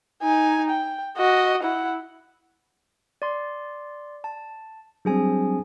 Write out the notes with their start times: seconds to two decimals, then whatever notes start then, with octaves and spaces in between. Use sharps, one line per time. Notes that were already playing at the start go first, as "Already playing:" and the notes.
0.23 D#4 G#5
0.70 G5
1.17 F#4 D#5
1.63 E4 F#5
3.22 D5 C6
4.24 A5
5.05 F#3 G3 C4 D4 G#4 G#5